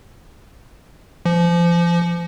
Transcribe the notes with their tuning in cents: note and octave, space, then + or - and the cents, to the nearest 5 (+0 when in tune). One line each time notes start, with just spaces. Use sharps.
F3 -30